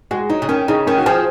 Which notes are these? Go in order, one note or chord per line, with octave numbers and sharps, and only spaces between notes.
G#3 F#4
F#3 D#4
C#3
D#3 C#4
C#3 D#4
D#3 C#4
F#4
F3 G#4